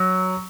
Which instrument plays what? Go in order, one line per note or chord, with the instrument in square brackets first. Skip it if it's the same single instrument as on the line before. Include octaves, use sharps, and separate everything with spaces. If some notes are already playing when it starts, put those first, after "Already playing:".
Already playing: [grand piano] F#3